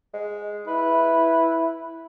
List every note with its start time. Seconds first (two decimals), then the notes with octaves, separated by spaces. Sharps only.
0.14 G#3
0.67 E4 B4